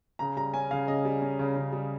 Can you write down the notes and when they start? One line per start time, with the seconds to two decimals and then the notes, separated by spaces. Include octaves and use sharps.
0.19 C#3 A#5
0.37 G3 A#5
0.53 C#4 G#5
0.71 C#3 F5
0.87 C#3 D#5
1.05 G3
1.22 C#4
1.39 C#3
1.56 C#3
1.72 G3